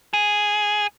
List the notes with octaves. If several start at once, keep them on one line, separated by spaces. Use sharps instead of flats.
G#4